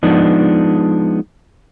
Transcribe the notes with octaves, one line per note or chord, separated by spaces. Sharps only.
F3 G#3 B3 D4 D#4